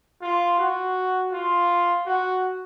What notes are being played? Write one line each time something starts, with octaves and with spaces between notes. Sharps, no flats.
F4
F#4
F4
F#4